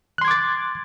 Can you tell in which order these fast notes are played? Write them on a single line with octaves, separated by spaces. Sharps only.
F#6 C6 G#6 D6 A6